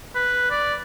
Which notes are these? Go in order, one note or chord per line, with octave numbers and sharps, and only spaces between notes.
B4
D5